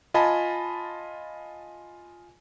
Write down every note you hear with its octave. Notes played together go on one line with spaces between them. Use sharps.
F4 D#5 G#5 A5 B5